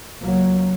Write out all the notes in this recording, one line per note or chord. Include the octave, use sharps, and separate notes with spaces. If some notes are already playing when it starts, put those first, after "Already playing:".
C#2 C#3 F#3 A#3